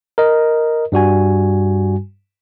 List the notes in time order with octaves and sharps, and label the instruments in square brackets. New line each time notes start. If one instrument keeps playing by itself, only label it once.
[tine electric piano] A#4 D#5
G2 G3 F#4 G#5